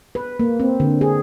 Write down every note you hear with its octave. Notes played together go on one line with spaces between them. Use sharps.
B4
A#3
C4
D3
G#4